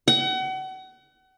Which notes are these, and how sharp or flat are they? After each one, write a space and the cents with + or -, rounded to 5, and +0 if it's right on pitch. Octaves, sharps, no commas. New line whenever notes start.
F#5 +35